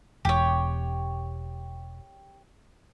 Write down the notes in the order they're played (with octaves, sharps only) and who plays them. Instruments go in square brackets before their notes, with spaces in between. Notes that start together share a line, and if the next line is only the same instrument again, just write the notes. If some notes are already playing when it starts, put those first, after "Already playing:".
[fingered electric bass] E1 [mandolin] G4 C#5